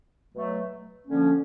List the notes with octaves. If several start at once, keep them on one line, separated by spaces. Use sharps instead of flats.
B2 F#3 A3
D3 F3 A#3 C#4